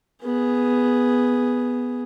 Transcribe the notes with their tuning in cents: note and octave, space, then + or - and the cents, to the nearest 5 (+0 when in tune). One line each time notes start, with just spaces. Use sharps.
B3 +0 G#4 +0